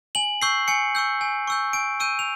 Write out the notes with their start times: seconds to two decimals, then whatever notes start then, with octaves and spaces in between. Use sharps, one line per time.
0.15 G#5 F#7
0.42 C#6 E6 G6 C7
0.68 G#5 C#7
0.95 C#6 E6 G6
1.21 G#5
1.47 C#6 E6 G6
1.73 G#5 D7
2.00 C#6 E6 G6 D#7
2.19 F7